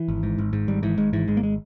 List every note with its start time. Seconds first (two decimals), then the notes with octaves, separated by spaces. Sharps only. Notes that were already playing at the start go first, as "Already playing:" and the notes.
Already playing: E3
0.08 G#1
0.23 G#2
0.38 G#1
0.53 G#2
0.68 G#1 G3
0.83 G#2 E3
0.98 G#1 G#3
1.13 G#2 E3
1.28 G#1 G#3
1.37 A#3
1.43 G#3